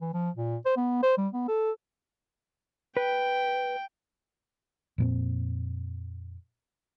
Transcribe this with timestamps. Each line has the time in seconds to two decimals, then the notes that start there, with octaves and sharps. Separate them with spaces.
0.02 E3
0.14 F3
0.36 A#2
0.66 C5
0.77 B3
1.03 C5
1.18 G3
1.33 B3
1.48 A4
2.97 B4 G5
4.98 F2 A#2 C4